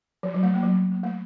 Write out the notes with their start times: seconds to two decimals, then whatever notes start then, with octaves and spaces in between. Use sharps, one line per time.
0.23 F3
0.34 F#3
0.43 A3
0.54 A#3
0.63 F#3
0.91 A#3
1.03 A3